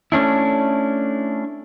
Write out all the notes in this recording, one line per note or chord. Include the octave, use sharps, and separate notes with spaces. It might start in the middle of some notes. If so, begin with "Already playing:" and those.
A3 C#4 D4 E4